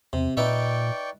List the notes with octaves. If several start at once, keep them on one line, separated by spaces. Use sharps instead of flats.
E2 C3
A#2 D#4 B4 D5 E5 G5 C#6